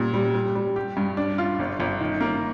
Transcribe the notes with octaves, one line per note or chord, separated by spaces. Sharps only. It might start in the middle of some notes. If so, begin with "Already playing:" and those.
Already playing: A#2 G3
G3
G3
G3
G4
G2
D4
F4
G1
G1
D#3
A#3